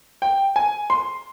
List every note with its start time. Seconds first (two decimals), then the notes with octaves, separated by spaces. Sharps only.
0.22 G5
0.56 G#5
0.90 C6